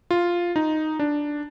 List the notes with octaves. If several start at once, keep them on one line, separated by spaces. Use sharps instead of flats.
F4
D#4
D4